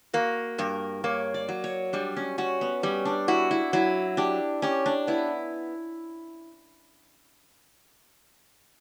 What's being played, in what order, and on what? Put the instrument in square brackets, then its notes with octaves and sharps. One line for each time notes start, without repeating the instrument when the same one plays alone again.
[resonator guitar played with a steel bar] A#3 [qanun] F#4
[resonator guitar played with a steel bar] G2 [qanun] A#4
[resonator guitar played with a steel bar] A#3 [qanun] C#5
[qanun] D5
[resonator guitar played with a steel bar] F#3
[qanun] C#5
[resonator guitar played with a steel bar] G3 [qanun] D4
[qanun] C#4
[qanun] C#4 [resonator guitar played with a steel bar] F#4
[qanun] B3
[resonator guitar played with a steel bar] G3 [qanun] C#4
[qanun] D4
[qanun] E4 [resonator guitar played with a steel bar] F#4
[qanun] E4
[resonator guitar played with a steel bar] F#3 [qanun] E4
[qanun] D4 [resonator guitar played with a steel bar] G4
[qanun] C#4 [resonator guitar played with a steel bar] G4
[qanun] D4
[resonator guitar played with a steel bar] B3 [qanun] E4